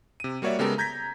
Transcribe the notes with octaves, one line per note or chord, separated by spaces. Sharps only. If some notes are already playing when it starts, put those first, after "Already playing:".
C3 D#7
G3 A#3 F#4 C#5 D5 E5
C#3 G#3 B3 G4 A4 A#4
A#5 G6 G#6 A#6 B6